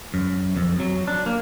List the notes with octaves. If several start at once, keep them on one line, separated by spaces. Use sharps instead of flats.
F#2
F2
F#3
D4
A#3